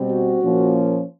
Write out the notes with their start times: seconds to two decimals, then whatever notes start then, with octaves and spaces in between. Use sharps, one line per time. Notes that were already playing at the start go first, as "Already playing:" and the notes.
Already playing: B2 G3 C4
0.09 F#4
0.41 A#2 F3 A#3 C#4